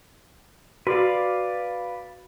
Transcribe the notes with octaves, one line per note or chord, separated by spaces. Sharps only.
F#4 B4 D5 F5